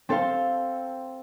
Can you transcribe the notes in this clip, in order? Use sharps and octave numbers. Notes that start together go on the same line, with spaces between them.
C4 A4 C5 F5